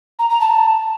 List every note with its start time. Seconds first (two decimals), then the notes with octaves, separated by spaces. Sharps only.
0.19 A#5
0.29 A#5
0.40 A5